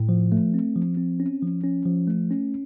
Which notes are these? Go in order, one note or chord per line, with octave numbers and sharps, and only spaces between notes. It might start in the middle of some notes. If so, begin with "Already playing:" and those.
Already playing: A2
F3
A3
C4
F3
C4
C#4
F3
C#4
F3
A3
C#4